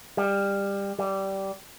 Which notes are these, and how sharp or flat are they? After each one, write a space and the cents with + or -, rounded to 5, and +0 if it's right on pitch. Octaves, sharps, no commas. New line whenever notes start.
G3 +20
G3 -15